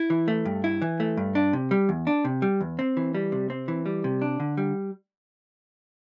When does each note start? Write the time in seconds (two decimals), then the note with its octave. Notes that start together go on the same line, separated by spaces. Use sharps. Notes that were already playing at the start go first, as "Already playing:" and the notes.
Already playing: E4
0.10 E3
0.28 A3
0.45 G2
0.64 E4
0.82 E3
1.00 A3
1.17 G2
1.35 D4
1.53 C3
1.71 G3
1.89 E2
2.07 D4
2.25 C3
2.42 G3
2.61 E2
2.79 C4
2.97 E3
3.15 G3
3.32 C3
3.50 C4
3.68 E3
3.86 G3
4.04 C3
4.22 D4
4.40 D3
4.57 G3